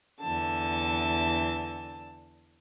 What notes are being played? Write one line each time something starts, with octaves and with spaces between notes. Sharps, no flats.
E2 D3 A5